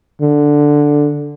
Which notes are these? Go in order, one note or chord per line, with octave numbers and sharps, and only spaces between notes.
D3